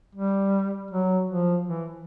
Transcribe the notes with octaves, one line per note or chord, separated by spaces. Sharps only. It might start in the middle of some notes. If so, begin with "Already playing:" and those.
G3
F#3
F3
E3